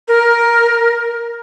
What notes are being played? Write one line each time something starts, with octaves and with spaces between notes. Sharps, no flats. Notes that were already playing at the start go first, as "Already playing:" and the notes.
A#4